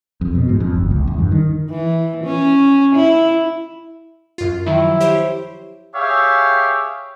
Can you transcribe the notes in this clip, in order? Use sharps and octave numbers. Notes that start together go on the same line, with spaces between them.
F2
B2
G#2
F2
G1
C#2
E2
G2
D#3
E3
C#4
E4
F#2 F4
D#3 F3 F#3 E4
G4 C5 C#5
G4 G#4 C#5 E5 F5 G5